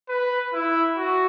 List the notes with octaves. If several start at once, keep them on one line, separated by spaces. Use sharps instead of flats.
B4
E4
F#4